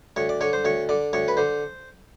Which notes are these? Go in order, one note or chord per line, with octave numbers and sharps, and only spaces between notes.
D2 C#5
D5
D3 C#5
C5
D2 C#5
D3 D5
D2 C#5
B4
D3 C5